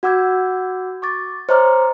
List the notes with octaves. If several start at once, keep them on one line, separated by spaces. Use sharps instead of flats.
F#4 F#5 D6 E6 G6 G#6
C#6 D6 A6
C5 C#5 D#5 A#5 D6 F6